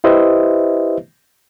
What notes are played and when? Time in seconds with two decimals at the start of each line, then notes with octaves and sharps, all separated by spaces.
0.04 E4 G4 B4 C5 D#5 E5